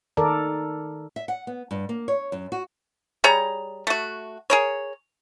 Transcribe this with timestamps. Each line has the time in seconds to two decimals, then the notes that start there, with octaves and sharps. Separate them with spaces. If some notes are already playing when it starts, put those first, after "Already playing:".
0.17 D#3 A4 A#4 D5
1.16 E5
1.28 F#5
1.47 B3
1.71 G2
1.89 A#3
2.08 C#5
2.32 F#2
2.52 F#4
3.24 G3 G#4 C#5 A#5
3.87 A3 F#4
4.50 G#4 A#4 C#5